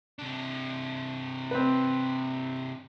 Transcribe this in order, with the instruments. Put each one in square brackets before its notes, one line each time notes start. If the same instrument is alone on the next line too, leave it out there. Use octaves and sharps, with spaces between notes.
[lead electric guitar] C3 D4
[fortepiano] C4 B4